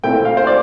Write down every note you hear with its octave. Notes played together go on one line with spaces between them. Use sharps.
A#2 A3 C4 E4 G5
F5
C5
D5